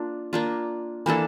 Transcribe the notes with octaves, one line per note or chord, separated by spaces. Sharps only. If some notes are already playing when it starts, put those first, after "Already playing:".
Already playing: A#3 D4 F4
A#3 D4 F4
E3 A#3 D4 A4